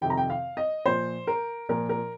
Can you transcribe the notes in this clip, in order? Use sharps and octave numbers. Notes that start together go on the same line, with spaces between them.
F2 C3 D#3 G5
A#5
G5
F5
D#5
A#2 F3 C5
A#4
A#2 F3 A#4
A#4